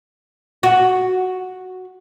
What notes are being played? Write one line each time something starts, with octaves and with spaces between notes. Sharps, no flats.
F#4